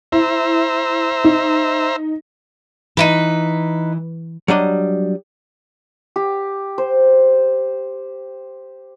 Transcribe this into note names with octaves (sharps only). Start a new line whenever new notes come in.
E4 C5 E5 A#5
D#4
E3 D#4 E4 B4
F#3 G3 D4 D#5
G4
C5